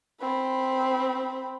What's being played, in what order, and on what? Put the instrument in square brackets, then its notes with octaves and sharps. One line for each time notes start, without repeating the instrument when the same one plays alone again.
[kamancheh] C4 B5